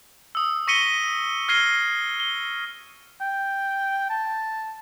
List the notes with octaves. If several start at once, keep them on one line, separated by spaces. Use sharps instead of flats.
D#6 E6
C#6 A#6 B6 C#7 D#7 G7
F6 G#6 A#6 C7 D#7 G7
G7
G5
A5